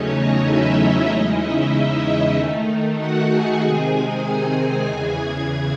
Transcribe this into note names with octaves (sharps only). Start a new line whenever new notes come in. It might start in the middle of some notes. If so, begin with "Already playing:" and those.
Already playing: E2 C#3 F#3 A3 C#4 D#4 C#5
D#4 D#5
E4 E5
E2 C#3 G#3 C#4 D#4 E4 D#5
E4 E5
D#4 D#5
D#3 A3 D#4
F#4 F#5
G#4 G#5
C3 D#3 G#3 C4 D#4 G#4 G#5
G#4 G#5
E2 C#3 E3 G#4 G#5